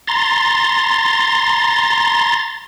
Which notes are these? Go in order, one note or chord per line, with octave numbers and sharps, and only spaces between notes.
A#5 C6 A6